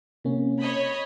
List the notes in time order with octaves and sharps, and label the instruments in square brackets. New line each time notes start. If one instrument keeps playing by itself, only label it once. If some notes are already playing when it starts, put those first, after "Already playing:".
[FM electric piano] C3 A#3 C#4
[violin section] C#5 D#5 B5